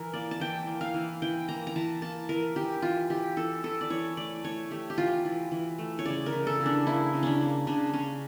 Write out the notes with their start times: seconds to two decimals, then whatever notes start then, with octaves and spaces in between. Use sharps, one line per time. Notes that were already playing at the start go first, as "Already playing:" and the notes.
Already playing: E3 A#4
0.14 A#3 D5
0.31 A5
0.40 E3 G5
0.67 A#3
0.81 F5
0.94 E3
1.22 E3 G5
1.49 A#3 A#5
1.67 A#5
1.76 E3 A5
2.02 A#3 A5
2.29 E3 A#4
2.55 E3 G4
2.82 E3 F4
3.10 E3 G4
3.37 E3 A4
3.63 E3 A4
3.81 D5
3.90 E3 C#5
4.17 A3 D5
4.44 A3 C#5
4.71 A3 G4
4.90 G4
4.98 E3 F4
5.25 E3
5.51 E3
5.78 A3
5.99 C#5
6.06 C#3 D5
6.26 A#4
6.32 E3
6.47 A4
6.60 C#3
6.66 D4
6.86 A#3 E4
7.13 C#3
7.23 C#4 D4
7.40 A#3
7.67 C#3 D4
7.93 C#3 C#4